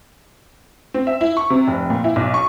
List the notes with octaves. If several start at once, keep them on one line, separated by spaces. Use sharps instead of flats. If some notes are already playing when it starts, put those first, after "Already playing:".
C4
E5
E4
C#6
C3
F1
A#2
E4
B1
C#6